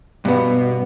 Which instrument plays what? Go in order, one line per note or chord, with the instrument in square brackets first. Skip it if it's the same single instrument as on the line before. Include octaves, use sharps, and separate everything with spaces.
[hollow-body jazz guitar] G2 B3 [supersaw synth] B2